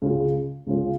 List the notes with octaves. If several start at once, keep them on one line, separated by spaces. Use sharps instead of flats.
C#2 C#3 G#3 C#4 F4
C#2 C#3 G#3 C#4 F4